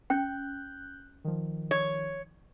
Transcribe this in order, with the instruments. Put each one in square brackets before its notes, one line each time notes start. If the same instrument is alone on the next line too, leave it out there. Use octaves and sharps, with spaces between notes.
[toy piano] C#4 G5 [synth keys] F#6 G6
[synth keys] D#3 F3
[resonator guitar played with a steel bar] C#5